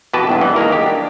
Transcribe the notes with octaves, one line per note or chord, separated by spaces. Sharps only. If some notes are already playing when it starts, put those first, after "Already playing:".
F2 B2 E3 G4 B4 A5
B1 E2 G2
E3 G3
D#3 G#3 A#3 A#4
G4
D4